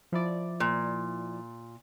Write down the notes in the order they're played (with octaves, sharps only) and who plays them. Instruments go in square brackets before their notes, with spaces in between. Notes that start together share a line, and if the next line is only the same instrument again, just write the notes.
[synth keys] F3 E4 D5
[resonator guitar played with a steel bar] A#2